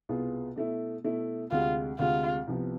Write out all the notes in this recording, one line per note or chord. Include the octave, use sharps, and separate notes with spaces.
C2 B2 B3 F4 G#4
B2 A3 E4
B2 A3 E4
D2 C3 G#3 F4
D2 C3 G#3 F4
C2 C3 F3 B3